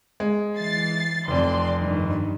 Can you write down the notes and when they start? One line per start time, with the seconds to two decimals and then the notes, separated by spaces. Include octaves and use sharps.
0.20 G#3
0.57 E3 A6 C7
1.28 F1 F2 D5 C6
1.78 G2 D#3